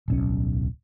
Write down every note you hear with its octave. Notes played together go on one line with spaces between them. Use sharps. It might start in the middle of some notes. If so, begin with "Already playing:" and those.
D1 B1 C#4